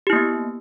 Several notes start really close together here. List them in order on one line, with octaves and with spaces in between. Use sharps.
G4 E4 A#3 B3